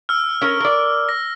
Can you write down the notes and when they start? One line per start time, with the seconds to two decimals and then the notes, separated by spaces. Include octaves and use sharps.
0.09 E6 F6
0.42 C#4 A#4
0.60 A#4 D5
1.09 A#6